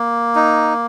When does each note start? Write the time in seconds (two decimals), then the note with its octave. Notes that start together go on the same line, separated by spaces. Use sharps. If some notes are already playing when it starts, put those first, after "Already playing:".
Already playing: A#3
0.36 D#4